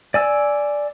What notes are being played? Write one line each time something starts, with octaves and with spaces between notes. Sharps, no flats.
D5 G#5 E6